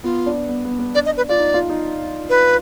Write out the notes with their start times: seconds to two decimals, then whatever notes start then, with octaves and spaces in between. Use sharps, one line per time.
0.04 B3 F4
0.26 D4
0.49 B3
0.65 B3
0.79 B3
0.95 D4 D5
1.06 D#5
1.17 B4
1.28 F4 D5
1.39 D#4
1.54 F4
1.69 D#4
2.29 B4